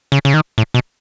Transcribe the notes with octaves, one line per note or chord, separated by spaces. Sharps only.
C#3
C#3
D#3
A2
B2